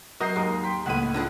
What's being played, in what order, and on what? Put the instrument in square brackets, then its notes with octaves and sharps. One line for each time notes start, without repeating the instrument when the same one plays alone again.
[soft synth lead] F#3 [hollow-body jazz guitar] F#4 A#4 D#5 [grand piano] D#6 G6 C7
[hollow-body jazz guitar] D#2 [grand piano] G#2 A#4 D#6
[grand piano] G5 C6 B6
[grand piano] C#2 A2 D#7 [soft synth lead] A#3 [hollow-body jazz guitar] F#5 B5
[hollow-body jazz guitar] D3 D4 G#4 [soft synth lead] F4